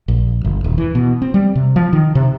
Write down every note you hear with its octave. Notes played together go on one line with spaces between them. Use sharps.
A#1
G1
D#1
E3
B2
C4
G3
C3
F3
D#3
C3